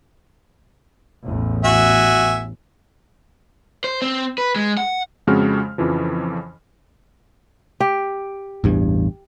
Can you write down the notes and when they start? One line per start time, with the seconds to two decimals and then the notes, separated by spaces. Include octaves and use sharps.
1.25 A1 E2
1.64 F#4 E5 G#5
3.84 C5
4.02 C4
4.38 B4
4.56 G#3
4.77 F#5
5.27 F2 C#3 G#3 C4 F#4 F6
5.78 F2 C#3 E3 F3
7.80 G4
8.64 A1 E2 G2